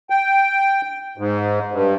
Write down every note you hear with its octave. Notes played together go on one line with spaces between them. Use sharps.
G5
G#2
G2